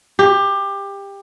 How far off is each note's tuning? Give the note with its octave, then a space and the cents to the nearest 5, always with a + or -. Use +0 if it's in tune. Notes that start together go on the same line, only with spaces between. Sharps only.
G4 +20